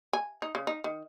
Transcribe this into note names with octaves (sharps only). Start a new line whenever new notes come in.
G#5
D#4
C#3
D#4
D#3